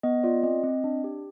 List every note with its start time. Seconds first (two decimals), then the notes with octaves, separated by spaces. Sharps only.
0.03 B3 D#5
0.23 F4 D5
0.43 C4 D#5
0.64 C4
0.84 D4
1.04 G4